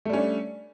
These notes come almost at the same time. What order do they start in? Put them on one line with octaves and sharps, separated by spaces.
A3 G3 C#4 D4